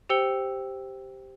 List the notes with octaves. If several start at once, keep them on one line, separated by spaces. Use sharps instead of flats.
G4 C5 G5 E6 C#7 G7